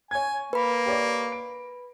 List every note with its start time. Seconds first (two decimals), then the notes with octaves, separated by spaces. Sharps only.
0.11 C#5 G#5 G#6
0.53 A#3 B4 B5
0.86 G4 C#5 D5
1.32 D7